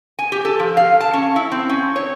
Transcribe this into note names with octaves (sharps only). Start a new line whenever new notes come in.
G#5
G4
A4
F3
F5
A5
C#4
E4
C4
C#4
C#5